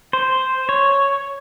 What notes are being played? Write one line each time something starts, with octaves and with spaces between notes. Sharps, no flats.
C5
C#5